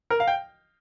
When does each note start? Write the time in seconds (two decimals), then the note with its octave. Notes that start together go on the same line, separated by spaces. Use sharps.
0.10 A#4
0.20 F5
0.28 G5